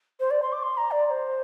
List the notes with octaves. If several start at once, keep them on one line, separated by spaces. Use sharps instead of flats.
C5
D5
C6
D6
C6
A#5
D5
D5
C5